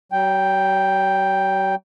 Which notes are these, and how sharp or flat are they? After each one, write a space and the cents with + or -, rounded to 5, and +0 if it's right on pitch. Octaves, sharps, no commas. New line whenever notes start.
F#3 +40 G5 +0